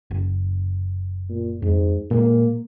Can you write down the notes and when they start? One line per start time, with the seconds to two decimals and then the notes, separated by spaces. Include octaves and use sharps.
0.11 F#1
1.30 A#2
1.62 F2 G#2
2.11 A#2 G#3 A#3